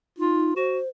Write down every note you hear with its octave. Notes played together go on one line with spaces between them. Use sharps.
D#4 F4
F#4 C5